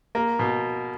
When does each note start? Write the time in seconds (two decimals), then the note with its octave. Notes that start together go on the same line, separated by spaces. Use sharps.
0.15 A#3
0.39 B2